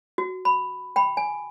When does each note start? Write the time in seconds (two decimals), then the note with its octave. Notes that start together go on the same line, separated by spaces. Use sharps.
0.18 F#4
0.45 B5
0.96 G5 B5
1.17 G#5